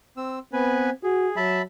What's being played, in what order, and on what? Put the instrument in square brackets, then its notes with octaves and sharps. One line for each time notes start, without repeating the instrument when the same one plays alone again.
[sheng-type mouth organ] C4 E6
[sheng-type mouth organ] B3 B4 G#5 [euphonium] C4
[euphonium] F#4 [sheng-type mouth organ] G#4
[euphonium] F#3 [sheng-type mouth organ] E5 A5 B5